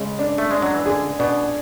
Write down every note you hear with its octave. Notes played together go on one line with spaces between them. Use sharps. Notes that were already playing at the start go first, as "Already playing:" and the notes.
Already playing: C#3 G#3
D4
A3
G#3 D4
F#3
E3
D3 G#4
B2 D4